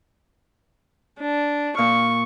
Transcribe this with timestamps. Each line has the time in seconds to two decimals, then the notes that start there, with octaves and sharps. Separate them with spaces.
1.20 D4
1.77 A#2 C#6 F6